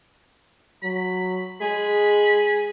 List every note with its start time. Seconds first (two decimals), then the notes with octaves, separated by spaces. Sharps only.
0.83 F#3 B5
1.61 G#3 G#4 B5